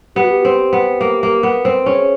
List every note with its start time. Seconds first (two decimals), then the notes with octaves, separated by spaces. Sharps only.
0.15 B3 G4
0.24 F#4
0.31 G4
0.45 C4
0.73 B3
1.01 A#3
1.23 A#3
1.43 B3
1.65 C4
1.86 C#4 G#4